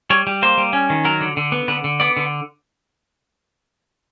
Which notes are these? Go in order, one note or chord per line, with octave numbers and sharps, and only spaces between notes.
G3 C#5
G3
A#3 C5
G3
C#4
D#3
F#3 A#4
D3
D3
B3
D3 B4
D3
B3 D5
D3